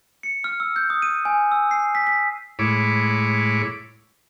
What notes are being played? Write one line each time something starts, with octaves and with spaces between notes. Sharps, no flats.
C#7
F6
E6
G6
D#6
D#7
G#5
E6
C7
B6
B6
A2 G#3 E4 C#5 B5 D6